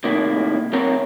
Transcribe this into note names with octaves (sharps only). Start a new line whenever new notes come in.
A2 C3 D#3 A#3 E4
D2 C4 A#4 C#5 A#5